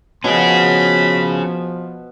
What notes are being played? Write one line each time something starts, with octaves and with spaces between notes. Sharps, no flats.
B2 F3 C#4 G#4 B5